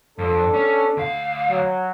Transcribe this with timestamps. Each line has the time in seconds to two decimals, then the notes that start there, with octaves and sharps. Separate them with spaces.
0.18 F2 D4 A4
0.54 C#4
0.97 D2 F5
1.49 F#3